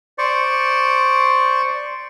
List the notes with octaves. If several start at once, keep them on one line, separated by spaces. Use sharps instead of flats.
C5 D5 C#6